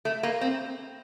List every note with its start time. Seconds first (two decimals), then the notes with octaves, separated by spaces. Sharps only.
0.05 A3
0.23 A#3
0.41 C4